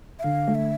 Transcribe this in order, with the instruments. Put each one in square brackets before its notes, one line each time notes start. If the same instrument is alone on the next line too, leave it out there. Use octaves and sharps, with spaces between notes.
[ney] E5
[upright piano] D3 [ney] F5
[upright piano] A3
[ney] E5